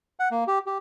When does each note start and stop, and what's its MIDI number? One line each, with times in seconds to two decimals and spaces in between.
0.20 0.29 78
0.31 0.44 58
0.47 0.59 67
0.66 0.78 67